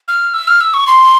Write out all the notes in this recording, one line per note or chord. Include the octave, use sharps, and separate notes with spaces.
F6
E6
F6
E6
C#6
C6